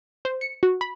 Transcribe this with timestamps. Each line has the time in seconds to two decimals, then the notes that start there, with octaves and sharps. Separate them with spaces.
0.25 C5
0.41 C#7
0.63 F#4
0.81 B5